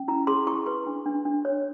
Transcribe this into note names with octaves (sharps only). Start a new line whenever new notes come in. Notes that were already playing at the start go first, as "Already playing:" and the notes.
Already playing: C#4
E4 A#5
G#4 C6
E4 C#6
B4 C6
D4
D4
D4
C#5